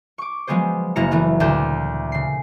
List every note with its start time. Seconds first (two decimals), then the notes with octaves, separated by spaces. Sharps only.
0.18 C#6 D6
0.47 F3 F#3 G#3 B3 G#4 C5
0.96 F#1 F#3 A#3 E4 A#5 C#7
1.11 E3 A3 B3 F#4
1.40 D2 A#2 A5 G6
2.12 C#3 C7